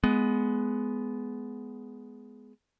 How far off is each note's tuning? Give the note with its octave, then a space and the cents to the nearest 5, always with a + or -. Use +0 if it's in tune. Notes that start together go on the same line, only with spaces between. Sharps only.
G#3 +15 B3 +10